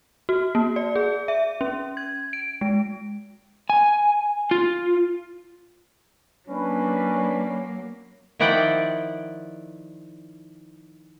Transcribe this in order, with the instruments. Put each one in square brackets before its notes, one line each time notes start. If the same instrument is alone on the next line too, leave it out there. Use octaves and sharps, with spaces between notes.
[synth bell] F#4
A#3
D5
G#4
E5
C#4
G#6
D7
G#3
[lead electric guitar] G#5
F4
[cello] F#3 A#3 [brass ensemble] C#4 D4 B4
[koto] D#3 F3 E4 D5 F#5 G5